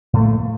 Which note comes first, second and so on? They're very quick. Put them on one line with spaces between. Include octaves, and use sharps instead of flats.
A2 A3 A#3